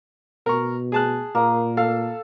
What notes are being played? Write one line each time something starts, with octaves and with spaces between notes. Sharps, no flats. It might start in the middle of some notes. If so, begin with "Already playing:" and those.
B2 A#4 C#6
G#4 A5 F#6
A#2 A#3 D#6
A4 F5